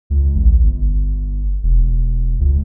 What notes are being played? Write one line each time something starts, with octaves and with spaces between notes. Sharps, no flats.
C#2
A1
G1
E1
C#2